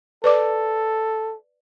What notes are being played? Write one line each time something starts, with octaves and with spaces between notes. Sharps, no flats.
A4 B4 D5 D6